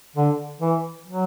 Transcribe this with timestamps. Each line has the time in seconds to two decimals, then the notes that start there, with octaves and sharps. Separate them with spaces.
0.16 D3
0.61 E3
1.06 F#3